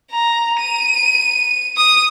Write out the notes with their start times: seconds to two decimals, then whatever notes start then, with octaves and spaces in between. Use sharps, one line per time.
0.11 A#5
0.59 D#7
1.77 D#6